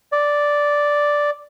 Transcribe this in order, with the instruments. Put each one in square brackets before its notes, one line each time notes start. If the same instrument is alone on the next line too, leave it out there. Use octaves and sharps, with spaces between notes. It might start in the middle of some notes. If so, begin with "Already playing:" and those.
[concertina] D5